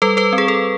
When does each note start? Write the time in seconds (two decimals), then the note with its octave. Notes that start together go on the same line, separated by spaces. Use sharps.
0.02 G3 A4 B4
0.17 A4 B4
0.33 C4
0.38 G#4
0.48 A4